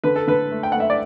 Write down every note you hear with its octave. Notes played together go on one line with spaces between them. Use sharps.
D3 B4
A4
D3 B4
A3
G5
A3 F#5
E5
D5